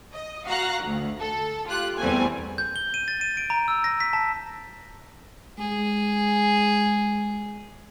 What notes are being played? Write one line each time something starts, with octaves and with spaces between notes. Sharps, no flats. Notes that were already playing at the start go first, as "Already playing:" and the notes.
D#5
F#4 F5 A#5 F#6
D2
A4
F4 G4 F#6
E2 G3 A3 C4 G#5
G6
G7
D#7
A6
D#7
D7
A#5
E6
A#6
B6
A5
G#3 G#4